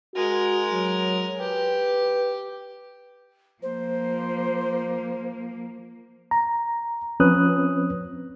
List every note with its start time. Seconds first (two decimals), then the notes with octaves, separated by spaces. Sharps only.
0.15 G#3 F#4 A#4
0.72 F#3
1.40 G4 B4
3.62 F3 A#3 C5
6.31 A#5
7.20 F3 C4 C#4 B4 D#6 F#6